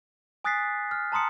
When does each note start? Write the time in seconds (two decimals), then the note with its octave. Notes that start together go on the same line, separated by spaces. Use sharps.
0.44 G#5 D#6 F#6 A6 B6 C7
0.91 F6
1.12 A5 A#5 C6 D#6 C#7